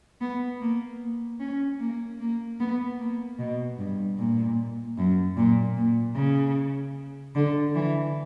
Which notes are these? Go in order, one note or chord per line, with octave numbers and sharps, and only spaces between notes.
B3
A#3
C#4
A#3
A#3
B3
A#3
B2
G2
A#2
F#2
A#2
A#2
C#3
D3
E3